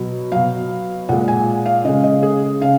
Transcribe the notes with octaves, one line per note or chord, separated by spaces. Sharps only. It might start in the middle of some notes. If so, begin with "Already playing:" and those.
Already playing: B2 F#3
B2 F#3 F5
A#2 G#3 F#5
G#5
F5
C#3 G#3 D#5
D#5
G#4
C#3 F5